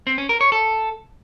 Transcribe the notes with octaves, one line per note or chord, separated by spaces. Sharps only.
C4
C#4
A#4
C#5
A4